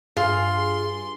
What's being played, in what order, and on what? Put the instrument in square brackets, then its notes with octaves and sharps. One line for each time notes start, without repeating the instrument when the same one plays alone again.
[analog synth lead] G2 [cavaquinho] F4 [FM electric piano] G#4 [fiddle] C6